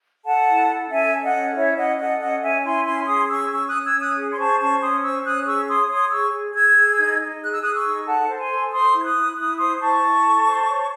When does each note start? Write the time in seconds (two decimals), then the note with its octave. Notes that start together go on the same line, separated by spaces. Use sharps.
0.24 A4 F#5 A5
0.47 E4
0.69 A4
0.90 C#4 E5 G#5
1.11 A4
1.23 D#5 F#5
1.33 C#4
1.55 E4 C#5 E5
1.77 C#4 D#5 F#5
1.99 A4 D#5 F#5
2.20 C#4 D#5 F#5
2.42 C#4 E5 G#5
2.63 E4 G#5 C6
2.85 C#4 G#5 C6
3.07 G#4 C6 D#6
3.29 C#4 C#6 E6
3.50 C#4 C#6 E6
3.67 D#6 F#6
3.73 C#4
3.84 E6 G#6
3.94 C#4
3.99 D#6 F#6
4.16 G#4
4.32 C6
4.37 C5 A5 C#6
4.59 C#4 A5 C#6
4.81 C#4 C6 D#6
5.02 C5 C#6 E6
5.24 C#4 D#6 F#6
5.46 G#4 C#6 E6
5.68 C#5 C6 D#6
5.89 C#5 C6 D#6
6.11 G#4 C#6 E6
6.33 G#4
6.54 G#4 E6 G#6
6.76 G#4
6.98 D#4
7.20 D#4
7.41 G#4 F#6
7.52 E6
7.62 G#4 D#6 F#6
7.75 C#6 E6
7.84 D#4
8.06 A4 F#5 A5
8.28 C5
8.39 G#5 C6
8.50 A4
8.72 C5 C6 D#6
8.94 E4
8.99 G#6
9.04 D#6 F#6
9.16 E4
9.37 E4 D#6 F#6
9.58 C5 C6 D#6
9.80 E4 A5 C#6
10.03 E4
10.23 A4
10.46 C5
10.68 C#5